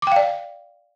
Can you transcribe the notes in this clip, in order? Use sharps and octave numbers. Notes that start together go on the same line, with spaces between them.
D5 F5 G5 D6